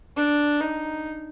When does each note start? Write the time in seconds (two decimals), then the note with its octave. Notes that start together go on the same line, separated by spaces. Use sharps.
0.16 D4
0.61 D#4